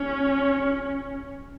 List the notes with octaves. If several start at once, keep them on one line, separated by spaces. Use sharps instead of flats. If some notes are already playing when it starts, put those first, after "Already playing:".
Already playing: C#4